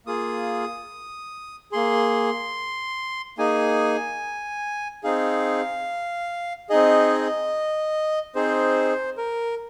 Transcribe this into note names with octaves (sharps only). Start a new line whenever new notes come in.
A#3 F4 G#4 D#6
A#3 G#4 C6
A#3 D#4 G#4 G#5
C4 D#4 G#4 F5
C4 D#4 G#4 D#5
C4 D#4 G#4 C5
A#4